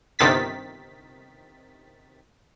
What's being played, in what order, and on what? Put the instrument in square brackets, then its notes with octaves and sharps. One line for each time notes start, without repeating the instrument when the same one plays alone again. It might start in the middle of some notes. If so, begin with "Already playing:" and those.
[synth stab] G1 C3 D#3 A6 B6